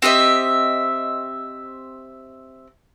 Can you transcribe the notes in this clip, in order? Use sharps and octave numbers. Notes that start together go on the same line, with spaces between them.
C4 G4 D#5 E5